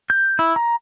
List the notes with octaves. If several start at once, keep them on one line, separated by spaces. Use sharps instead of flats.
G6
E4
A#5